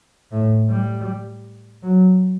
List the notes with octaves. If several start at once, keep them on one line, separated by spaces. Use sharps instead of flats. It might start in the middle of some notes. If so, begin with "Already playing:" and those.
A2
G3
F#3